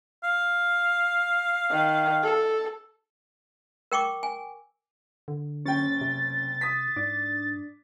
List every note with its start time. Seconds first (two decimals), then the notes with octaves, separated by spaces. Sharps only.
0.23 F5
1.71 D#3
2.24 A4
3.92 A#4 G5 C#6 D6
4.23 G#5
5.28 D3
5.66 F#1 C#4 G5 A6
6.01 C3
6.61 D#6 B6
6.96 G#2 D4